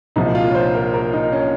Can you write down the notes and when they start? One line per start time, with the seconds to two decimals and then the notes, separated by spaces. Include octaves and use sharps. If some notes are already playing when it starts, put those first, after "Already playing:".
0.16 C2 A#2 F3 D#4
0.35 F4
0.51 C#5
0.55 C5
0.75 A#4
0.94 A#4
1.13 D#4
1.32 C#4